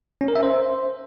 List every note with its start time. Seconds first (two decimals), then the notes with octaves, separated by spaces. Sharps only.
0.21 C#4
0.28 A#4
0.35 E5
0.43 C5